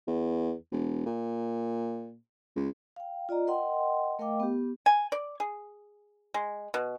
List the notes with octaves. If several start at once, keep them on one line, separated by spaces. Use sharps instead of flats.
E2
E1
A#2
C#2
F5 G5
F4 D5 D#5 A#5
A#4 D#5 F#5 G5 C6
A3 A#4 D#5 F5 G5 D6
B3 G4
G#5
D5
G#4
G#3
B2